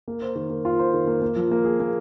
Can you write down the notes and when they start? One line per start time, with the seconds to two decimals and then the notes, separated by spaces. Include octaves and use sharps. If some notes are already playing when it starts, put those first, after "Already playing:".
0.08 A#3
0.22 C5
0.36 D#3
0.50 A#3
0.65 F4
0.79 C5
0.94 D#3
1.07 A#3
1.22 A#3
1.36 F3
1.51 A#3
1.65 G#4
1.80 A#3